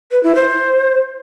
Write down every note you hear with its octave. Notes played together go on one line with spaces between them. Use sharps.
B4
E4
C5